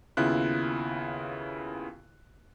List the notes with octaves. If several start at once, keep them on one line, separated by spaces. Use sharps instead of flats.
D#2 C#3 B3 E4 F4 F#6